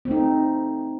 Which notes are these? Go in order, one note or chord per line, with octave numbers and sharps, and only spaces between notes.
A3 C4 D#4